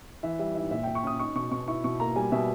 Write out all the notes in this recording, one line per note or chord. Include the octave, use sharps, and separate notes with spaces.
E3 E5
G3 E5
G#2 E5
A#2 E5
A#2 G5
C#6
C#4 D#6
D#4 C#6
B2 C#6
B2 C#6
E4 C#6
B2 C#6
A#3 A#5
G3 G#5
B2 E5